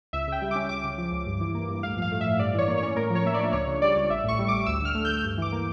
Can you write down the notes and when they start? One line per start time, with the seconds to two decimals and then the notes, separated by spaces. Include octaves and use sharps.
0.13 C#2 E5
0.27 C#3 G5
0.42 G3
0.51 C#4 D6
0.69 C#2 D6
0.84 C#3
0.98 F3
1.12 C#2
1.26 G2
1.41 E3
1.55 A#3
1.69 G2
1.83 A2 F5
1.97 F3 F5
2.12 A3
2.21 E5
2.26 A2
2.39 G2 D5
2.54 E3 C#5
2.68 A#3
2.78 C#4 C#5
2.96 A2 A#4
3.10 F3 C#5
3.25 A#3 E5
3.34 D5
3.40 D4
3.53 C#2 C#5
3.67 C#3
3.82 G3 D5
3.96 C#2
4.10 A1 E5
4.24 A2 C#6
4.39 G3
4.48 A1 D6
4.66 D2 E6
4.82 D3 F6
4.95 A3
5.05 D2 G6
5.24 G2
5.37 E3 D6
5.52 A#3